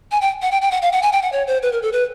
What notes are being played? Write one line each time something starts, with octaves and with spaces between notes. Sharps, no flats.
G#5
G5
F#5
G5
G5
F#5
F5
F#5
G#5
G5
F#5
C#5
C5
B4
A#4
A4
B4